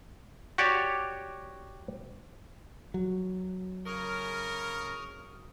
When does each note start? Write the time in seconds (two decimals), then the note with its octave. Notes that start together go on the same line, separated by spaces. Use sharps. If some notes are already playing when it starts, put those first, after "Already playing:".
0.58 F#4 G4 C#5 D5
2.94 F#3
3.86 C#3 A#4 C#6 D#6 F6